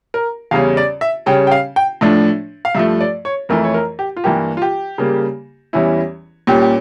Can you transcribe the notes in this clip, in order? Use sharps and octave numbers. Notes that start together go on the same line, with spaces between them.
A#4
E2 C#3 G3 C#4 F5
D5
E5
C#3 G3 C#4 G5
G5
F5
G5
A2 F3 A3 D4
F5
G2 F3 A3 E5
D5
C#5
F2 E3 A3 E4 A#4
C#5
A#4
G4
F4
G2 E3 G3 A#3 G4
F4
G4
C#3 G3 A#3
E2 E3 G3 C#4 E4
A#2 G3 C#4 G4
G4